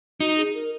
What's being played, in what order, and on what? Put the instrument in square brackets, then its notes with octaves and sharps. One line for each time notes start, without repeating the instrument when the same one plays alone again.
[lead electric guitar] D#4 [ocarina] F#4
[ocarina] G#4
A#4